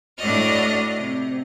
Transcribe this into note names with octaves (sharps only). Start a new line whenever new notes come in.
A2 D4 F#4 D5 D#5 F6
C3